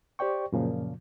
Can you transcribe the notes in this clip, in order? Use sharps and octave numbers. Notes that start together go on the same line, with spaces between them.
G4 C5 D5 G5 C#6
F#2 A#2 C#3 F3